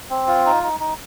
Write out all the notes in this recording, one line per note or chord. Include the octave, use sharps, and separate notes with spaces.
C4
F4
D#4
D#4
D#4